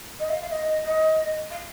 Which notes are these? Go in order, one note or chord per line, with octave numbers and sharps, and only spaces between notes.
D#5
F5
F5
D#5
D#5
F5